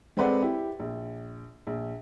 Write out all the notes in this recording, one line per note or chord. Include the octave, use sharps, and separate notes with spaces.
G#3 C4 A4 B4 D5 F#5
E4 G4
A#1
A#1